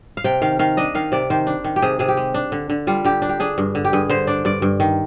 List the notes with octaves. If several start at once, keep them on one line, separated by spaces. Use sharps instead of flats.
F5
C3 G5
D#3 F5
D#3 F5
D4 D#5
D#3 F5
C3 D5
D#3 C5
D4
D#3
G4
C3 G#4
C3 G#4
G4
G#3
D4
D3
D3
G3 F4
D3 G4
D4
G4
D4 G#4
G2
D3
G4
G2 G#4
D3 C5
D4 D5
G2 D5
G2
D#3